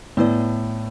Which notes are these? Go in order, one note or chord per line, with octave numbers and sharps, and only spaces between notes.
A2 B3 E4 B4 D5